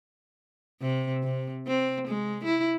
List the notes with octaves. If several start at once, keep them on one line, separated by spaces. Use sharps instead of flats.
C3
C3
C4
G#3
E4